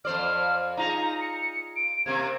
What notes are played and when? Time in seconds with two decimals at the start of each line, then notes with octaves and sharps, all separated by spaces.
0.05 F2 C5 D5 F6
0.77 D#4 F4 G#4 A#5
1.21 C#7
1.76 D7
2.06 C3 A#3 C4 G#6